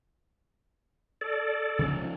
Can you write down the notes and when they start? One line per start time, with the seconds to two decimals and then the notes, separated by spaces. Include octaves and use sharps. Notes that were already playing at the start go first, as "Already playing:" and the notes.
1.21 A4 D5
1.79 C#3 F3 C#4